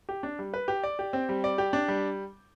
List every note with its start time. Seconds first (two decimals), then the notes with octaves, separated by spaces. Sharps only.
0.09 G4
0.23 D4
0.39 G3
0.54 B4
0.68 G4
0.84 D5
0.99 G4
1.13 C4
1.29 G3
1.44 D5
1.58 G4
1.73 D4
1.88 G3